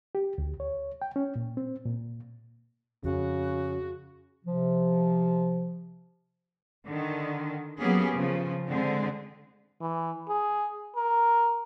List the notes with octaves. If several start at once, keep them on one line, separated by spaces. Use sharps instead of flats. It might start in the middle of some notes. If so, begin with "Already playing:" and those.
G4
D2
C#5
G5
C#4
A#2
C4
A#2
F2 C#3 F#4
C3 F3
D3 D#3
F#3 A#3 B3 C#4 G4 G#4
C#3 F3
D3 G#3 C4
E3
G#4
A#4